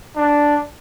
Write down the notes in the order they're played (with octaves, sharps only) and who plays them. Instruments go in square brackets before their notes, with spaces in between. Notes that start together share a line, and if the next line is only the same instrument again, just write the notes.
[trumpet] D4